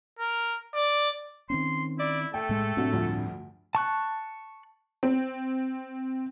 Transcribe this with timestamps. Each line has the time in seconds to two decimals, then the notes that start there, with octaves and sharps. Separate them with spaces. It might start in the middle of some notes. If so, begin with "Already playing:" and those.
0.19 A#4
0.75 D5
1.50 D#3 C4 C#4 C6
1.99 E4 D5
2.34 A3 A4 G5
2.49 A2 G#3
2.77 A2 C3 F#3 C4 D4 F#4
2.93 D2 G2 F3
3.75 A5 C#6 F#6
5.03 C4